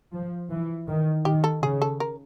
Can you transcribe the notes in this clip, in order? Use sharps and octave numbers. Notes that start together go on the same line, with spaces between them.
F3
E3
D#3
D#3 G4
A4
C#3 G#4
A4
A#4